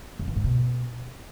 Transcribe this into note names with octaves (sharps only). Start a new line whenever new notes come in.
F2
E3
G#2
B2